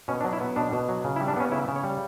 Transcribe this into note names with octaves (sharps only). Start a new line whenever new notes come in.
B2 C#4
D4
F#3
E4
B3
B2 D4
B2
F#3
C#3
E4
G3
D4
B3 C#4
C#3 E4
C#3
C#5
G3